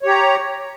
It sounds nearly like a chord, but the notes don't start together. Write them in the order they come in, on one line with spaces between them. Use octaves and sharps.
C#5 G4 A#5